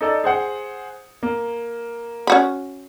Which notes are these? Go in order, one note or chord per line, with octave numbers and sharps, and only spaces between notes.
D#4 A4 D5
G#4 C5 F#5
A#3
C#4 F#4 B5